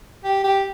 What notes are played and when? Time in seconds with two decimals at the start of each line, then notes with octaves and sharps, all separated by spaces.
0.25 G4
0.44 G4